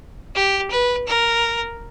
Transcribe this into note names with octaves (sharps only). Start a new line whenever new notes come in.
G4
B4
A#4